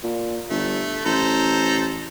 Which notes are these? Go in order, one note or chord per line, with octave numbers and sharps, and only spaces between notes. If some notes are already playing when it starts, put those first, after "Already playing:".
A#2
G1 A3
A1 A4 C5 A#5